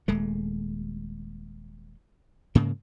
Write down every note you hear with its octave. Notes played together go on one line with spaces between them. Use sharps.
D#1 G#3 A3
G#2 C#3 A#3